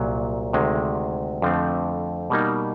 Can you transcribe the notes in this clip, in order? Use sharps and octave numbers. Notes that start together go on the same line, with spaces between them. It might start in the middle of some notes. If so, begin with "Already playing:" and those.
Already playing: C2 A#2 F#3
D2 C3 D#3 G#3
F2 D3 F3 A3 C4
B2 G3 A#3 D#4